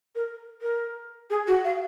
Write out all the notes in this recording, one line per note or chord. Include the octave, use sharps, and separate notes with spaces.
A#4
A#4
G#4
F#4
F5